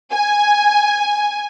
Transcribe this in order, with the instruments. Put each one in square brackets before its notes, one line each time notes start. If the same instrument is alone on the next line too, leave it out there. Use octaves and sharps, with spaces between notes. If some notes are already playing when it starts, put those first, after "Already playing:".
[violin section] G#5